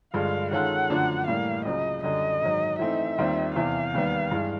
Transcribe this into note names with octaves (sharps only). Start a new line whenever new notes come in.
G2 D3 F3 G#3 F5
D#3 G#3 C#4 F4 A4 F#5
F#2 D3 F3 A3 D4
A2 E3 G3 A#3 F5
C#2 C#3 F#3 D#5
F#2 D3 G3 D#5
G#2 D#3 F#3
E3 A3 C4 D#4 E5
D#2 D#3 G3 C4 F4
E2 C3 E3 F5
D#2 D#3 G3 B3
G2 E3 G#3